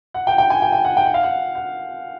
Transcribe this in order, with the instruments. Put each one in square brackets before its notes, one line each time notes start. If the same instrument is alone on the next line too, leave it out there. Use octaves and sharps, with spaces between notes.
[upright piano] F#5
G5
G5
G#5
G5
G5
F#5
G5
F#5
F5
F#5
F#5